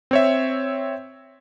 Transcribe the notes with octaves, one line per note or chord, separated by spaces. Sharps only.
C4 C#5 E5